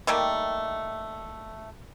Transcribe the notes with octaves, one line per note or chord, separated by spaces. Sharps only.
D#3 G3 A3 A#3